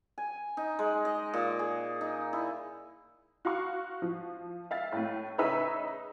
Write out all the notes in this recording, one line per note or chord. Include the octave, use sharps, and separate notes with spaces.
G#5
D#4
G#3
D#5
A#2
G#4
D#4
E4
F#4 F5 C#6
F3
E5 F5 A6
A2 A3
C#3 D#4 B4 C#5 E5 E6